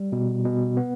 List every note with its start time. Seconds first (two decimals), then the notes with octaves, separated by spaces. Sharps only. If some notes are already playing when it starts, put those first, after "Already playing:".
Already playing: G3
0.12 B2
0.45 B2
0.77 B3